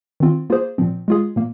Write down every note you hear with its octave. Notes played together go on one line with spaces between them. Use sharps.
D#3 C4 F4
A#3 F4 G#4 C5
A#2 F3 C4
G#3 F4 G#4
A#2 A#3